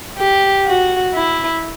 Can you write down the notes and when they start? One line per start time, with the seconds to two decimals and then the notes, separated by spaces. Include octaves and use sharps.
0.17 G4
0.66 F#4
1.14 E4